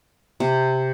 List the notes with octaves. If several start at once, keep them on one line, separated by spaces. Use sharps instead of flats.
C3